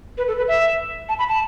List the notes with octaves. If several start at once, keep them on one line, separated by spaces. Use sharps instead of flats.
B4
A4
B4
E5
A5
B5
A5